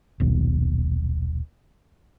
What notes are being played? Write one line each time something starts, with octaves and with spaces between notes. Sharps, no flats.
D#1 B1